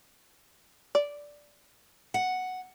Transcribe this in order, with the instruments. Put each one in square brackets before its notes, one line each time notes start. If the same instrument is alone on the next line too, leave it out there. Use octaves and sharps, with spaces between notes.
[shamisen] D5
[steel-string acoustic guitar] F#5